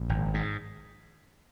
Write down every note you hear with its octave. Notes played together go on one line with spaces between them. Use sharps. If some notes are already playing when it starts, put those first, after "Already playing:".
Already playing: A#1
G#1
G#2